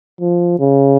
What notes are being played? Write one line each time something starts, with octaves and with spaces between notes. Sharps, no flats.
F3
C#3